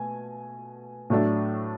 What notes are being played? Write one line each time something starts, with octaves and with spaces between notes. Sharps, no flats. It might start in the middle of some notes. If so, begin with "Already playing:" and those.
Already playing: B2 A3 G#5
A2 F#3 A3 D4